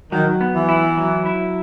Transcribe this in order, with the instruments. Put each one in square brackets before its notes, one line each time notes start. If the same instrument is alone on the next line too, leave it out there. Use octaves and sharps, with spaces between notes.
[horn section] D#3 [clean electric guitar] F#3
[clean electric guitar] B3
[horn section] E3
[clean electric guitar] E4
F#3
E4